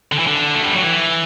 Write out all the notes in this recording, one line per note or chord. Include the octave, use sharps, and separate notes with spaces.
D3
E3
D3
A3
G3
F#3
E3